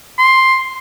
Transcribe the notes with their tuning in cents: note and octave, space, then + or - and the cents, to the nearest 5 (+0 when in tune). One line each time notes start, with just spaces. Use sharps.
C6 +5